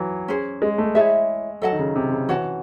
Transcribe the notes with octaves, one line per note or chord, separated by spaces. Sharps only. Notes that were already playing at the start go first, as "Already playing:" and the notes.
Already playing: E3 F#3
C#4 G#4 C5
G#3
A3
G#3 E4 G#4 C#5 E5
F#3 A4 D#5 F#5 A5
D#3
C#3
C3
C#3
E3 F#4 C#5 F#5 A5